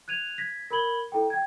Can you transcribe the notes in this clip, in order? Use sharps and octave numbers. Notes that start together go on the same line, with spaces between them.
F#6 G#6 D#7 F7
G#6 A#6 B6
A#4 B5 G#6 F#7 G7
E4 A4 G5
G5 G#6